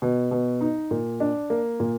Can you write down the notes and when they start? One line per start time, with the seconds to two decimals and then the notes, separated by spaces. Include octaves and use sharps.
0.02 B2
0.31 B2
0.61 D#4
0.91 A#2
1.20 D4
1.50 A#3
1.80 A#2